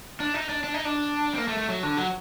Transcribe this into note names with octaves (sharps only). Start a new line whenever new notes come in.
D4
D#4
D4
D4
D#4
D4
C4
A#3
A3
A3
F#3
D3
F#3